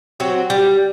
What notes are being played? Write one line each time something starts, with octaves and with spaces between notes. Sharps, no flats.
F#3 C4 F#4
G3